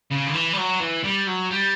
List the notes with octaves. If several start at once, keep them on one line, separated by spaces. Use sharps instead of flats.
C#3
D3
E3
G3
F#3
E3
G3
F#3
G3